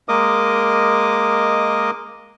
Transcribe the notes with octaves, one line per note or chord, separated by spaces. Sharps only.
G#3 A#3 A#4 D#5 D6 D#6